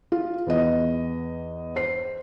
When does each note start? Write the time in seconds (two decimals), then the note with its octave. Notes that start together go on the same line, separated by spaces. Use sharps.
0.12 F4
0.47 E2 B3 D#5
1.76 C5 C7